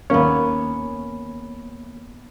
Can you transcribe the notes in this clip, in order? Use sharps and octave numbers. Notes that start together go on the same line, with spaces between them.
D#2 A#3 B3 C#4 C#5